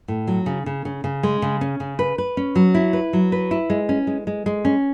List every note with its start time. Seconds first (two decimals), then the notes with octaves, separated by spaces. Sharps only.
0.08 A2
0.28 F#3
0.46 C#3
0.66 C#3
0.85 C#3
1.04 C#3
1.23 G#3
1.42 C#3
1.61 C#4
1.80 C#3
1.99 B4
2.18 B4
2.37 C#4
2.56 F#3
2.75 E4
2.93 B4
3.13 F#3
3.32 B4
3.51 E4
3.70 G#3
3.89 C#4
4.07 G#3
4.27 G#3
4.46 G#3
4.65 C#4